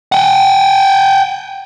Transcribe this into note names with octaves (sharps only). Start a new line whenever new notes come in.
F#5 G5